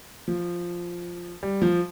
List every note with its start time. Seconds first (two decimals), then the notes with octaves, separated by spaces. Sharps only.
0.28 F3
1.43 G3
1.62 F3